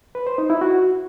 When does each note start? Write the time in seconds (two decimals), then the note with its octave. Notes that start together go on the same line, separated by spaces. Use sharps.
0.15 B4
0.27 C5
0.38 D#4
0.50 E4
0.61 F#4